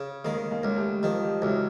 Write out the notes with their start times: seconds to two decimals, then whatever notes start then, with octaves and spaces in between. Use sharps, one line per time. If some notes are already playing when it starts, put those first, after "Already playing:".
Already playing: C#3
0.24 D#3 G#3 A#3
0.51 G#3 A#3
0.63 C#2
0.77 G3 A3
1.02 D#3 F3 G3
1.22 F3 G3
1.42 C#2 E3 F#3